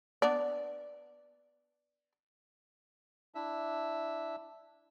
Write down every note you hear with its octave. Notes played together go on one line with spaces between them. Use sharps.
B3 D4 D5
D4 E4 E5